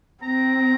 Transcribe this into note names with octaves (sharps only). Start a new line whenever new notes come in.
C4 A#5